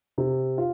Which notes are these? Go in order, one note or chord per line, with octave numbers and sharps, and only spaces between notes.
C3
F4